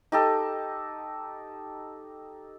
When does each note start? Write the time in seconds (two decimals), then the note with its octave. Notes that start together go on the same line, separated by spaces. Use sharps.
0.12 D#4 G4 A4